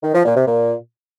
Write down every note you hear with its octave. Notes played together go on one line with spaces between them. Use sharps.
D#3
F3
A#2
C3
A#2